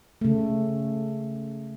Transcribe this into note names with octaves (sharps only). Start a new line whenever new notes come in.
C#3 A3